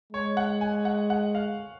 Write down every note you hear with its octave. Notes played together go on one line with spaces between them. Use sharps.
G#3 C#5
F#5
G#5
F#5
F#5
F5